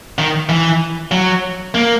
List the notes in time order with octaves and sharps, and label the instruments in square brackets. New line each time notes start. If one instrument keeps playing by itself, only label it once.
[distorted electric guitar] D#3
E3
F#3
A#3